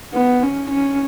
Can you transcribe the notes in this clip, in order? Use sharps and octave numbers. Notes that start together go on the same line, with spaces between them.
B3
C#4
C#4